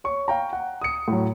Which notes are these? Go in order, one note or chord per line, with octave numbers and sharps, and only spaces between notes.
C#5 C#6
F5 G5 A#5
F#5
D#6 C#7
A2 F#3